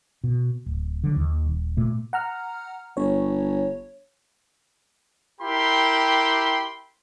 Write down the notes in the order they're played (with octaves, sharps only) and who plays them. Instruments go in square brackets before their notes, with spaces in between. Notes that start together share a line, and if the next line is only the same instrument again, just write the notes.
[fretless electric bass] B2
D1
D3 F#3
D#2
D#1
A#2 A3
[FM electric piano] F#5 A#5 F6
[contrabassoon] G1 [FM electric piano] C#5
[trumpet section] E4 G4 A#4 G5 B5 C6